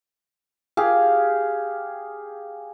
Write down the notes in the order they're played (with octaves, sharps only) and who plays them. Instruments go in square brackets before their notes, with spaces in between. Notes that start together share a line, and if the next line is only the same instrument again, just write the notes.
[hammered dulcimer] G4 G#4 F5